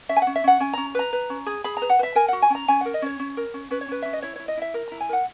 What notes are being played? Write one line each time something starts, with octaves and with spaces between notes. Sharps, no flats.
C#4 E5
G#5
C#4 F#5
E5
C#4 F#5
C#4 G#5
C#4 A#5
B4 A#5
B4
C#4
G#4
G#4 B5
B4 A#5
F#5
B4 E5
A#4 G#5
F#4 F#5
G#5
C#4 A#5
C#4 G#5
A#4 F#5
D#5
C#4 C#5
C#4
A#4
C#4
C#4 B4
C#5
C#4 B4
C#4 E5
D#5
E4 C#5
E4 C#5
D#5
E4 E5
A#4
E4 A#5
G#5
A#4 F#5